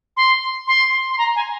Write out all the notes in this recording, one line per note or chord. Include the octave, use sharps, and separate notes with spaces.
C6
C6
C6
A#5
G#5